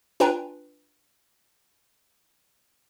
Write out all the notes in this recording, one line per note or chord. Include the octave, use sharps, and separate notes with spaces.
D4 F4 B4 G5 G#5 A#5